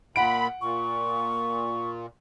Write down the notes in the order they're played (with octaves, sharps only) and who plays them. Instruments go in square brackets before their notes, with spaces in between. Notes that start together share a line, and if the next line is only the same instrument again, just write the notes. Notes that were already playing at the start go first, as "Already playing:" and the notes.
[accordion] A#2 B5 [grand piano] F#5 D7
[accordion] A#2 [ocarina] C#6